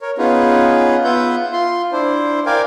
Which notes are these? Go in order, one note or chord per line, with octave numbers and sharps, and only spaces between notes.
A#4 C#5
B3 C#4 D#4 F4 G#4 B4
B3 F4 B4 E5 F#5 G6
F4 C6
D4 E4 C5
A#4 D5 F5 G5 G#5